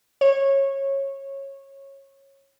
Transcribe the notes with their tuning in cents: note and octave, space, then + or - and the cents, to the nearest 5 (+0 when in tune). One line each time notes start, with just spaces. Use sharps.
C#5 -20